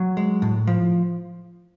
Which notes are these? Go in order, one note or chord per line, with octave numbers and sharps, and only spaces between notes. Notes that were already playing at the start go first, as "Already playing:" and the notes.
Already playing: F#3
G#3
A2
F3